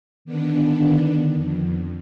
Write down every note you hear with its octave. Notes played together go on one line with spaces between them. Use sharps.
D3 D#3 B3 D4
F2